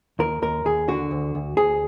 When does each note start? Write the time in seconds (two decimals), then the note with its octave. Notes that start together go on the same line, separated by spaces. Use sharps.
0.19 D#2 A#4
0.42 D#2 A#4
0.65 D#2 G#4
0.88 D3 F#4
1.11 D2
1.35 D2
1.57 D2 G#4